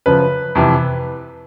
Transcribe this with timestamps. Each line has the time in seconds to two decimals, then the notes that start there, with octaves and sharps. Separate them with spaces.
0.06 F#2 C#3 F3 B4
0.55 F2 C3 E3